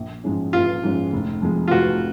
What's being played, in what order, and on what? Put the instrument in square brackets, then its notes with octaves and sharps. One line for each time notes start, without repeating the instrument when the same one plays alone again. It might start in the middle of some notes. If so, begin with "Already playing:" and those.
Already playing: [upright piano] A#1
G#2 F3 G#3 C#4
[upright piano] A#1 [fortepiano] F4
[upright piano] G#2 F3 G#3 C#4
F1
F2 F3 G#3
[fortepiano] F4
[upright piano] F1 [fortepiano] F#4